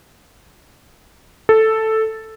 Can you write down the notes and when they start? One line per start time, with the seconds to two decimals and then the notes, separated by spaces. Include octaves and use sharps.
1.49 A4